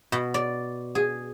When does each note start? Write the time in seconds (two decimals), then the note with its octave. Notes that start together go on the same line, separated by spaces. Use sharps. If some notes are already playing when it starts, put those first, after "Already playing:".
0.12 B2
0.34 D5
0.95 G#4